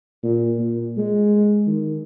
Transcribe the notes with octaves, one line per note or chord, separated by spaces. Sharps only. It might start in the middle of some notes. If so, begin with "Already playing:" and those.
A#2
A#2
G#3
D#3